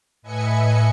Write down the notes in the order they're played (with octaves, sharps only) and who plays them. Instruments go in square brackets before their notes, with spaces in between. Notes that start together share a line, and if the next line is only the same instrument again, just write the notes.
[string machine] A2 B4 D#5 E5 G#5 C#7